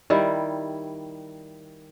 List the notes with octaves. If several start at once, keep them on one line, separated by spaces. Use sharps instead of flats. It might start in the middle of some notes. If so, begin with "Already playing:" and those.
D#3 G3 E4